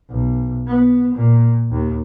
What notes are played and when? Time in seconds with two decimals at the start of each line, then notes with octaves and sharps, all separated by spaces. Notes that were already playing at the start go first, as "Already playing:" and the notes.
0.11 B1
0.67 B3
1.15 A#2
1.71 D#2